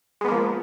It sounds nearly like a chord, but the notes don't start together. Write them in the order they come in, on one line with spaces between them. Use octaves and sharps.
G#3 B3 A#3 F3